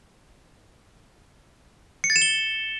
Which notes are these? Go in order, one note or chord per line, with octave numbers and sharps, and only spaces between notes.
C#7
A6
E7
G7